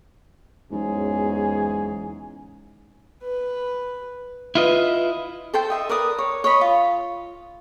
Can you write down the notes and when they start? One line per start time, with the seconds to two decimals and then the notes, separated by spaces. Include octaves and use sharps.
0.72 E2 G#2 F#3 C#4 G#4
3.23 B4
4.55 E4 F4 B4 D#5
5.54 A4 C5 G5 A5
5.70 D#5 E5 D#6
5.89 A#4 B4 D5 D#6
6.19 C#5
6.44 C#5 D#5 B5
6.61 F4